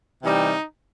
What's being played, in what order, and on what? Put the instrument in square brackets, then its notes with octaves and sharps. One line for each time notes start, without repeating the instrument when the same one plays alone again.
[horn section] C3 E3 G3 D#4